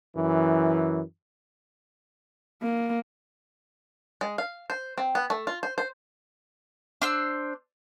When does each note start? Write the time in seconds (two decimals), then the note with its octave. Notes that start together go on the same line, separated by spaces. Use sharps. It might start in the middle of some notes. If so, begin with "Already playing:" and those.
0.16 F#2 E3
2.63 A#3
4.21 G#3
4.38 F5
4.70 C5
4.98 C4
5.15 B3
5.30 A3
5.47 F4
5.63 C5
5.78 C5
7.02 D4 C5 E6